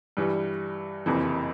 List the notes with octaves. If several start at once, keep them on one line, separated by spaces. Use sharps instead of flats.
G2 E3 G3
F#1 F2 C3 E3